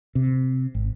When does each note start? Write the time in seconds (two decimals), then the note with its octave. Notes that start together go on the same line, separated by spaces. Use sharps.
0.15 C3
0.75 G#1